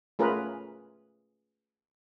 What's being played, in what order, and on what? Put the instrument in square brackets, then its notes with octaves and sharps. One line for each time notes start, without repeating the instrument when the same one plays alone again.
[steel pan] A3 C#4 F4 G#4 A#4 B4